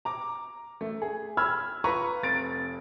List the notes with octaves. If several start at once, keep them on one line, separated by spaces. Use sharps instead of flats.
A#5 D6
A3
G#4
B5 E6 F6 G#6
F4 B4 A#5 C#6
F1 A6 D7